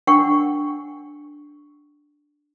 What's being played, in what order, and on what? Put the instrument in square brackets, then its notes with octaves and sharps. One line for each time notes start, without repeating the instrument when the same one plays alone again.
[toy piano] D4 A#4 F#5 G5 C#6